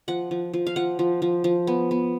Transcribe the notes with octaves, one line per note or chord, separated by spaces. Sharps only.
F3 F#5
F3
F3
F5
F3 F#5
F3
F3
F3
B3
B3